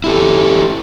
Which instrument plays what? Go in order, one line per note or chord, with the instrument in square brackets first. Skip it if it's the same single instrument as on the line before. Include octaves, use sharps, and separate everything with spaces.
[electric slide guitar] E4 G4 A4